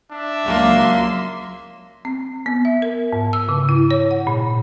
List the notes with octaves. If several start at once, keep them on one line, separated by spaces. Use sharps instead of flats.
D4 E5
C#2 F#3 A#3 C6
C4
B3
E5
A#4
G#2
E6
C#3
E4
C#5
F#5
A#2